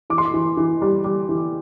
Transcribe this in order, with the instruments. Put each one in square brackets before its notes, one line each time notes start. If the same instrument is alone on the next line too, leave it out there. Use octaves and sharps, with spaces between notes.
[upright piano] E3 D6
C6
D6
E3
E3
G3
G3
E3